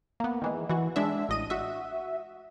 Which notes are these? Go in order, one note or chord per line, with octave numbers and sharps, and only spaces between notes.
A#3 B3
D#3 E3 G#3
E3 F#4
G#3 D4 E5
A1 D#5 D#7
F#4 E5